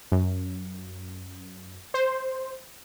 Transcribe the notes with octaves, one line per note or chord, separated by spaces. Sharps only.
F#2
C5